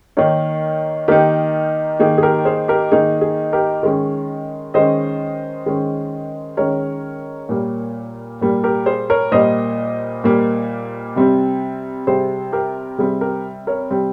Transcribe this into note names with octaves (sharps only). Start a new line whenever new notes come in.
D#3 A#3 D#4 A#4 C#5
D#3 A#3 D#4 G4 A#4
D#3 A#3 D#4 G#4
G#4
G4 A#4
G#4 C5
G4 A#4
D#3 A#3 D#4 G#4
G#4
G4 A#4
D#3 G#3 C#4
D#3 G#3 C#4 C5 D#5
D#3 G#3 C#4
D#3 G#3 C#4 A#4 C#5
A#2 G3 A#3
A#2 G3 A#3
G4 A#4
G#4 C5
A#4 C#5
A#2 G3 A#3 C5 D#5
A#2 G3 A#3
C3 G3 C4
C3 G3 C4 G#4 C5
G4 A#4
C3 G3 C4 G#4
G4 A#4
A#4 C#5
C3 G3 C4